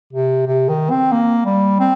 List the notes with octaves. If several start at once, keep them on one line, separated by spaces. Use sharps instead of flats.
C3
C3
D#3
C4
A#3
G3
C4